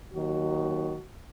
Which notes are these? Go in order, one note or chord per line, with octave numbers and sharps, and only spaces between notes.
D#2 D#3 F#3 F#4